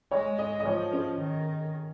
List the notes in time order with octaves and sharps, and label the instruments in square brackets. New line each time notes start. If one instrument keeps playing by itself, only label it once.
[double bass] G#3 [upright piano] C#5
[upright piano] D#5
D#5
[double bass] F3 [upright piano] C#5
[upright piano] C#4
[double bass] D#3